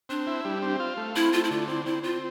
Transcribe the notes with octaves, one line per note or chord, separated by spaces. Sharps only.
C4 D4
E4
G3
C4
F4
A3
C4 E4
A3 F4
E4
D3 F4
C4 E4
C4 E4
C4 F4